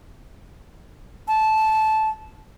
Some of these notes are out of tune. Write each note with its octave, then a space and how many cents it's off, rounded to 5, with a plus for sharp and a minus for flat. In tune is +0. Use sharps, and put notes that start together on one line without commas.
A5 -15